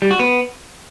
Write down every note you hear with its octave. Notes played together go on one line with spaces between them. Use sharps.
G3
F#4
B3